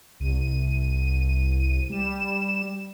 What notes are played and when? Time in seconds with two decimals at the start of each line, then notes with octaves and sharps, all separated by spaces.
0.20 C2 D#7
1.90 G3 E7